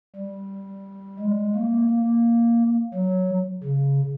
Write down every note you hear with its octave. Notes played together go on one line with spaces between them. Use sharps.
G3
G#3
A#3
A#3
F#3
C#3